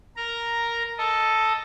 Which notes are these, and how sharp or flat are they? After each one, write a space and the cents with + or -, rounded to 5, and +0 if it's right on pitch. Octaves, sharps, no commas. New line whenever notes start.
A#4 +0 A#5 +0
A4 +0 D#5 +0